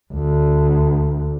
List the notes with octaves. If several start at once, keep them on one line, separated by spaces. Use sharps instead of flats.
D2